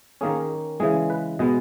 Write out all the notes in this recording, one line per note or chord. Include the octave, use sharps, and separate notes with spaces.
D#3 A#3 C#4 G#4
C#3 E3 G#3 G#4
B4
B2 G#3 B3 D#5